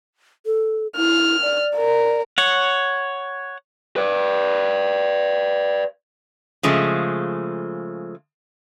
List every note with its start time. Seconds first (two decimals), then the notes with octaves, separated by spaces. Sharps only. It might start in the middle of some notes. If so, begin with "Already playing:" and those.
0.46 A4
0.97 E4 F6
1.42 D5
1.77 A#4
2.38 C#5 F#5
3.96 B4 D5
6.63 C#3 F3 G#3 A3